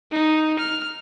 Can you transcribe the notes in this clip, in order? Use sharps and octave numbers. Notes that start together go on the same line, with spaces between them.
D#4
F6